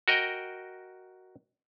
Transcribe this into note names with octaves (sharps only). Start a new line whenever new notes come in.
F#4 A#4 D#5 G5